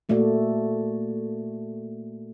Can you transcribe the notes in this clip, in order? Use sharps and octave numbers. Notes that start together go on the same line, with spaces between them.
A#2 A3 A#3 F#4 D5